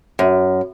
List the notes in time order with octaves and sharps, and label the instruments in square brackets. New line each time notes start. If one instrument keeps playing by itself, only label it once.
[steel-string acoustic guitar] F#2